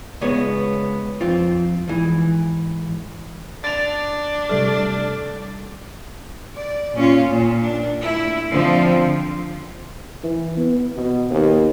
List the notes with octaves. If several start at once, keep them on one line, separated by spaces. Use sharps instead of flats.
C#2 G#3 B3 C#5
F2 C4 F4
G#2 E3
D4 A6 F7
C3 G3 A3 F6
D5
A#2 C#4 F4
A#2
D4
A3 E4
D3 F3 C4 F4
E3
B3
B2
D#2